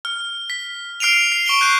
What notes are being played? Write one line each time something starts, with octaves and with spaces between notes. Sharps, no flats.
F6
B6
F6 C7 D7 D#7 F7
C7
C#6 D7 G7
F#6 G6 C7 D#7